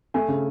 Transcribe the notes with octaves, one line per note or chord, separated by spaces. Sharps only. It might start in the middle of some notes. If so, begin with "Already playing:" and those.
A3 G#5
C#3